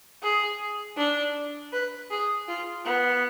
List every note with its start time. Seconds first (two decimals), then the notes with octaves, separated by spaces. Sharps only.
0.22 G#4
0.96 D4
1.72 B4
2.10 G#4
2.48 F4
2.85 B3